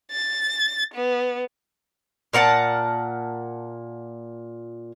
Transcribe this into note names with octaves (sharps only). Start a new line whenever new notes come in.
A6
B3
A#2 A#4 F#5 A5